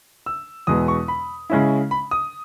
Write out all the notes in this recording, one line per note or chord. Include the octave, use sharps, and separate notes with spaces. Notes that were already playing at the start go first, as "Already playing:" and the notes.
E6
E2 B2 G#3 B3 D#6
C#6
B5
C#3 G#3 C#4 E4
B5
D#6